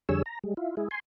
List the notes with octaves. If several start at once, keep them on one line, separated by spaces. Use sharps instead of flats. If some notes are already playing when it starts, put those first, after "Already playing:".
F2 D3 G3 G#4 C#5 E6
A#5
G3 G#3
E4 F4
G#3 E4 G#4
G#5 C6